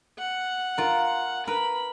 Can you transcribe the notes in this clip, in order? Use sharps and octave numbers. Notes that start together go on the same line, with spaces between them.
F#5
F4 A#4
A#4 B4 B5